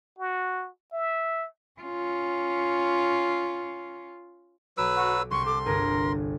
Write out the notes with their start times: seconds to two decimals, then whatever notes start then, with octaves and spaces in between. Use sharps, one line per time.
0.19 F#4
0.93 E5
1.81 C#4 F4
4.78 B1 F#3 B4 E6 D7
4.95 F#4
5.31 C2 G5 C6 C#6
5.46 A4 D6
5.65 G1 G#4 A#4 D7